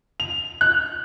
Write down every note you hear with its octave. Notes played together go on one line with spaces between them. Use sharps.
F7
F#6